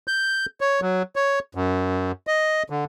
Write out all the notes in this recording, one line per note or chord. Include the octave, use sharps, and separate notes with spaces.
G6
C#5
F#3
C#5
F#2
D#5
D3